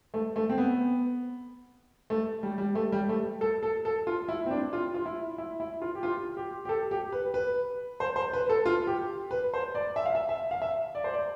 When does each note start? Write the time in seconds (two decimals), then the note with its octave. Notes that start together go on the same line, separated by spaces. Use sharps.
0.14 A3
0.36 A3
0.50 C4
0.58 B3
2.10 A3
2.43 G3
2.58 G3
2.75 A3
2.92 G3
3.09 A3
3.41 A4
3.63 A4
3.85 A4
4.07 F4
4.28 E4
4.46 C4
4.51 D4
4.73 F4
4.94 F4
5.06 E4
5.38 E4
5.60 E4
5.82 F4
5.95 G4
6.03 F4
6.37 G4
6.65 G4
6.69 A4
6.91 G4
7.12 B4
7.34 B4
8.00 C5
8.16 C5
8.33 B4
8.49 A4
8.66 F4
8.87 G4
9.31 B4
9.54 C5
9.75 D5
9.96 E5
10.06 F5
10.15 E5
10.29 E5
10.51 F5
10.62 E5
10.95 D5
11.04 C5
11.14 D5